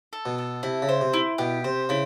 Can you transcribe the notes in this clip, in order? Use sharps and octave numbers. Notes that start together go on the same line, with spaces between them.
A4
B2
A4
C3 E4
C#3
C5
C3
E4
B2 G4
C3 C5
C#3 E4